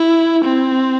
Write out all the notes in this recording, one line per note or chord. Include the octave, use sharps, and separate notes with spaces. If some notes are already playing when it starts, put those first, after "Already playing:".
Already playing: E4
C4